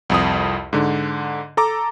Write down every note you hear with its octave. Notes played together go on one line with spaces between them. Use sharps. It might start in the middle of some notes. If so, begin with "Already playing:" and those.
C2 F2 D#6
G#2 D3
A4 A#5 D6